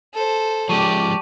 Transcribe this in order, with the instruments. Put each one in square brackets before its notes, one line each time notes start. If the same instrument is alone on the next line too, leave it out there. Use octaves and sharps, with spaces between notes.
[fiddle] A4 C5
[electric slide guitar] F3 G#3 C#4 [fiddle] G4 D5 [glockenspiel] A5 C#6 D#7